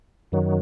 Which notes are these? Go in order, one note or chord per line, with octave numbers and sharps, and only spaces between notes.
F#2 D#3 F#3